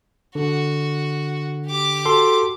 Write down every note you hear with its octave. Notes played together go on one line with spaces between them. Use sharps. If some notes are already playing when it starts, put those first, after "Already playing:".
D3 F#4
G4 D6
F#4 A4 C6